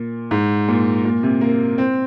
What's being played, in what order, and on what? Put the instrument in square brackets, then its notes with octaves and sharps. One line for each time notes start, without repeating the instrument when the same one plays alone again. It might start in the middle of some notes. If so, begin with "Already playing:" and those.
Already playing: [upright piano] A#2
G#2
A#2
A#2
C3
A#3
C4